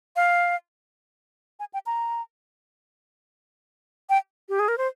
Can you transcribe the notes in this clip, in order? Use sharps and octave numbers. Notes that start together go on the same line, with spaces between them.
F5
G#5
G5
A#5
G5
G4
G#4
A#4
C5